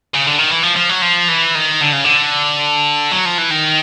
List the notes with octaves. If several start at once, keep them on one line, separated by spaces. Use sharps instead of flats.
C#3
D3
D#3
E3
F3
F3
F#3
F3
E3
D#3
D3
C#3
D3
F#3
F3
E3
D#3